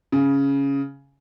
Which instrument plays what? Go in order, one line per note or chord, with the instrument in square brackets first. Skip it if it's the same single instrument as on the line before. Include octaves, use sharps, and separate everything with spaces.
[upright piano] C#3